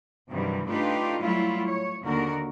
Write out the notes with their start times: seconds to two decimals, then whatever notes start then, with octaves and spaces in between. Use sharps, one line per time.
0.31 G2 C3 D#3 E3 F#3 G3
0.67 A3 D4 D#4 F4 G4 B4
1.21 F#3 G3 A3 E4 F4
1.66 C#5
2.05 D#2 D3 F#4 A#4